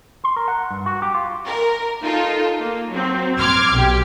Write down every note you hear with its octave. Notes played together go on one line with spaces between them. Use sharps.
C6
A#4
F#5
G2
F#4
G4
F4
A#4
D#4 F4 A4
A#3
F#3 C4
C6 D6 F6 G#6
B1 G4